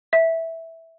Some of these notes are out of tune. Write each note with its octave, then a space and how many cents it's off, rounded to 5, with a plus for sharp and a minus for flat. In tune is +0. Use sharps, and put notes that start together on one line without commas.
E5 -5